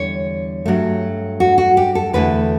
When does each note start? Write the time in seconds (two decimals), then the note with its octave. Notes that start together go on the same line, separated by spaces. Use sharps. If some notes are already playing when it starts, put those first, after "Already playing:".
Already playing: E2 D3 G3 C#5
0.66 G2 F#3 A3
1.40 F#4
1.58 F#4
1.77 G4
1.95 A4
2.13 E2 D3 A3 E4 B4